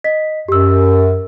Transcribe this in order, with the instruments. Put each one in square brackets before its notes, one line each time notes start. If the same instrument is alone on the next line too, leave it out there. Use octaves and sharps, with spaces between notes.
[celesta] D#5 B6
[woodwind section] F#2 [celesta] G4 E6